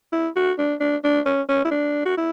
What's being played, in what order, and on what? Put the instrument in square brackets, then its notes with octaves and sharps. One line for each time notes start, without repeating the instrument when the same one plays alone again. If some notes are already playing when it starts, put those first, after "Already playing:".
[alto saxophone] E4
F#4
D4
D4
D4
C#4
C#4
E4
D4
F#4
E4